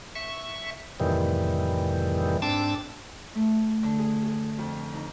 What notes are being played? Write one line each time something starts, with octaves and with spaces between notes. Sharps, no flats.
E5 C#6
F2 A2 C3 D#3 E3 G3
G#2 C4 D4 A5 D6 E6
A3
D3
G#4
G#4
F2
D#4